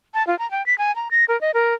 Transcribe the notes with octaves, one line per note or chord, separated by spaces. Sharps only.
A5
F4
A#5
G5
B6
G#5
A#5
A#6
A#4
D#5
A#4